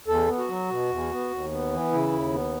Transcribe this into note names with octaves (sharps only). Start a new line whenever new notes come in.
E2 A4
B3
F#4
F#3
B2
E2
B3
D#2
B3
E3
C#3 E4
D#2
B3